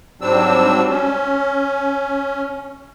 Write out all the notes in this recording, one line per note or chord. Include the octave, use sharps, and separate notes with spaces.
G#2 F#3 G3 C4 D4 E6
C#4